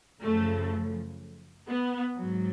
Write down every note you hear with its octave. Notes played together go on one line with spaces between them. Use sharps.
F#2 C#3 F3 A3
B3
G#2 F#3